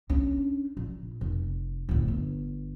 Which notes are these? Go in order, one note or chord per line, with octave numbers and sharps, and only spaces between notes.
C#4 D4
A#1
F1
G1 A2
G1